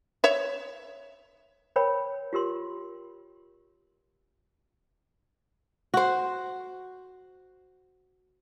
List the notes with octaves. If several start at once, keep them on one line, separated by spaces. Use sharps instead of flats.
C#5 E5
A#4 C#5 G5 B5
F4 G4 A#4 C6
F#4 C5